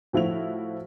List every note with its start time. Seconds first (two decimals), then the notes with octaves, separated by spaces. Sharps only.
0.13 A2 F3 E4 F#4 F7